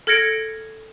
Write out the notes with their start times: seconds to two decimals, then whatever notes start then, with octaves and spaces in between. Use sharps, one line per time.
0.07 A4 F6 G#6 A#6 C#7 D7